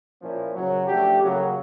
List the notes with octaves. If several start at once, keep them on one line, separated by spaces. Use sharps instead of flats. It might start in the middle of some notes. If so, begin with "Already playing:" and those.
A#2 F3 A#3 C#4 E4
F#2 C#3 F#3
F3 A3 D4 G4
F#2 C#3 F#3 A#3